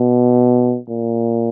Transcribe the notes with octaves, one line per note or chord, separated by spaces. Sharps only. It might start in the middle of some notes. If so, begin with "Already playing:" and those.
Already playing: B2
A#2